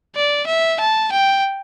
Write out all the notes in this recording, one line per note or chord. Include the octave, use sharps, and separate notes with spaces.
D5
E5
A5
G5